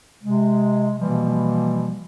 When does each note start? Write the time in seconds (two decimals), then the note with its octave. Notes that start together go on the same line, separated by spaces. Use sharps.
0.22 C3 G#3
0.98 B2 E3 F3 G3 A#3